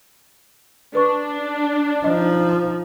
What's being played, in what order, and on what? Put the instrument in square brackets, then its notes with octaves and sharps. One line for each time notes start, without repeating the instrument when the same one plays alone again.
[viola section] D4 [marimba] B4 C#6
[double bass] F3 D#4 [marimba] D#5